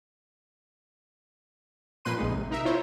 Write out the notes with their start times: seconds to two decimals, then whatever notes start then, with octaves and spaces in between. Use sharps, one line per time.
2.05 A#2 F3 A#3 B4 C6 D#7
2.17 A#1 F2 G#2 D#4
2.32 C3
2.51 D#4 A#4 E5
2.65 E4 F4 C5 C#5